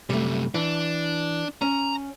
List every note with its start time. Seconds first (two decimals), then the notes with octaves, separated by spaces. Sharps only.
0.10 F#2 C3 G3 A3
0.54 E3 D4
1.62 C#4 A#5